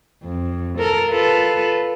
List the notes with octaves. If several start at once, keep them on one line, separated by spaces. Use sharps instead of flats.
F2
A4 A#4
F4 A4 B4